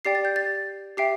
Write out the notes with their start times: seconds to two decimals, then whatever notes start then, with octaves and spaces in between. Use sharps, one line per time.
0.05 G4 D5 G5 C7
0.15 A6
0.25 G6
0.36 A6
0.97 G4 E5 G5 C7